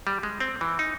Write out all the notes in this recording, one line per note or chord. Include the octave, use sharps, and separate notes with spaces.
G3
G#3
C4
E3
D#4